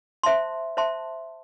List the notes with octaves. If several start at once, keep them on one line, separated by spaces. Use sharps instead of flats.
C5 E5 A5 C6
C5 E5 A5 C6